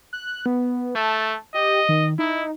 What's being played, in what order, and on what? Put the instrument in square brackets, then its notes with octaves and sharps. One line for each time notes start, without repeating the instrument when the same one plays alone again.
[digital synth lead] F#6
B3
[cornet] A3 [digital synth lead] A5
[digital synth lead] G4 [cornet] D#5
[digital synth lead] D#3
[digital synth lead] D#4 [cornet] E4